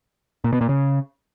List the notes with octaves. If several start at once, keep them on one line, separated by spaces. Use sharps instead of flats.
A#2
B2
A#2
C#3